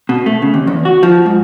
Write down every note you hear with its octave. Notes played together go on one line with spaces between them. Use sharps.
B2
A3
C#3
D#2
E2
F#4
F3
G#2